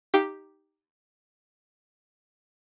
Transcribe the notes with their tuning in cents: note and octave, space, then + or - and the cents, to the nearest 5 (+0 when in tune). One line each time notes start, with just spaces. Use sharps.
D#4 +0 G4 +0 F5 +0